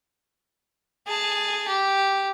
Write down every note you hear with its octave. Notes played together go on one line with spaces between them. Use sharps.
G#4 A5
G4